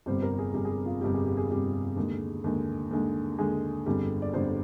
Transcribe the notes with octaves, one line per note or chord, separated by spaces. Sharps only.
G1 F2 C3 G3 C5
A#4
G#4
G1 F2 C3 G3 G#4
G#4
G4
F4
G1 F2 C3 G3 G4
G#4
G4
G#4
G1 F2 C3 G3
D#2 D3 G#3
D#2 D3 G#3
D#2 D3 G#3
D#2 D3 G#3 G#4
G1 F2 D3 G3
D5
G1 F2 D3 G3 C5